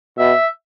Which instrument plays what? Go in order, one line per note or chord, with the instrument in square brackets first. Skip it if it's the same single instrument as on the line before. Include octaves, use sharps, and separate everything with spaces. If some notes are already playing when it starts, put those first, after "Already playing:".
[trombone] B2 [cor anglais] E5